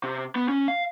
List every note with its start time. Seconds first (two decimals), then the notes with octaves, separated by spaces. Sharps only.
0.04 C3
0.36 B3
0.49 C#4
0.68 F5